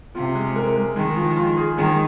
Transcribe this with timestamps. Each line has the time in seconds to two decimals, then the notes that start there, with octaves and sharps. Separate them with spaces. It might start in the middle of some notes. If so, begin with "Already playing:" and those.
0.15 C3 F4
0.35 G#3
0.56 A#4
0.76 G#3
0.96 D#3 G#3
1.16 F3
1.36 F4
1.57 G#4
1.77 D#3 G#3